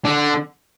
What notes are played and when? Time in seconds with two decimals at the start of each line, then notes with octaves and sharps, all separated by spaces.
0.05 D3